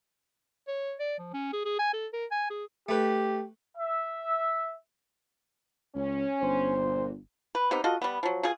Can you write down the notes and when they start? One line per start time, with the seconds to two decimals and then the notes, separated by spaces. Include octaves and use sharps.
0.68 C#5
1.00 D5
1.19 F3
1.34 C#4
1.53 G#4
1.65 G#4
1.79 G#5
1.94 A4
2.13 A#4
2.31 G#5
2.51 G#4
2.89 A3 G4 B4
3.77 E5
5.95 C#2 C#4
6.41 G1 C5
6.77 A#2
7.55 B4
7.71 C3 B3 D#4
7.84 F4 F#4 A4 D#5
8.02 G3 B3
8.23 F3 F#3
8.43 B2 F4 G#4